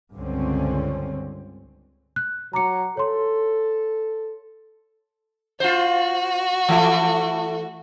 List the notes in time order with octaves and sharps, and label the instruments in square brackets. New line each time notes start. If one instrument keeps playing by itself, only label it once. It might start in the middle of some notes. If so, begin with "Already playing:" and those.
[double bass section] C#2 G2 D3 C4 C#4
[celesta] F#6
[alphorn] F#3 [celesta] A#5 D6 C#7
[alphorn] A4 [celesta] C#5 C6
[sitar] F4 C5 [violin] F#4
[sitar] E3 A3